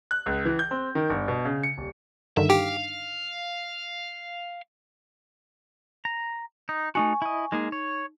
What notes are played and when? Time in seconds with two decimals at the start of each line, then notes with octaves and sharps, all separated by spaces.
0.11 F#6
0.26 C#2
0.45 E3
0.59 G6
0.71 C4
0.95 D#3
1.10 G1
1.28 B2
1.45 C#3
1.63 C#7
1.78 D#1
2.37 G2 D3 D#3 E5
2.50 G4 F5
6.05 A#5
6.69 D#4
6.95 A3 D#4 F#4 G#5 C#6
7.22 E4 D#5
7.52 G#3 A#3 D#4 G#4
7.72 C#5